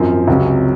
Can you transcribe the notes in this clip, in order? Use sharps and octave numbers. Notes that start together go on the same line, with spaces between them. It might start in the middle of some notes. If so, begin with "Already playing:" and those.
Already playing: G#1 F#2 F3
C#2 C3 F#3 C#4